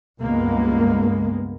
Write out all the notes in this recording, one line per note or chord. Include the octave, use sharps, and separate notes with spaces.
C#2 G2 G#3 A#3 B3